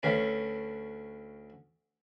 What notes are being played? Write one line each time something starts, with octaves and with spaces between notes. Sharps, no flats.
D2 D3 C#4 B4